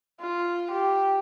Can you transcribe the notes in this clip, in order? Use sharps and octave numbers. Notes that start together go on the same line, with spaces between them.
F4
G4